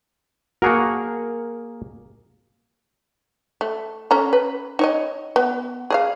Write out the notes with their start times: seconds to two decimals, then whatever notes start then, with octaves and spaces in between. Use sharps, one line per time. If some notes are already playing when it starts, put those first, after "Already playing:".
0.62 A#3 F#4 G#4 A#4 F#5 A5
3.61 A3
4.11 C#4 A4 A#5
4.33 B4
4.79 D#4 C#5 D#5
5.36 B3
5.90 G#4 D#5 F5